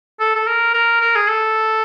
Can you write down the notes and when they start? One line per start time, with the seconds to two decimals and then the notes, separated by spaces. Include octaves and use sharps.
0.20 A4
0.35 A4
0.47 A#4
0.73 A#4
1.00 A#4
1.15 G#4
1.28 A4